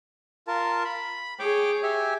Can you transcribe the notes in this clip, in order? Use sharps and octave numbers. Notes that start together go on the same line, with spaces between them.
F4 A#4 A5
B5
G#4 C#5 G5 D6
G4 E5 G#5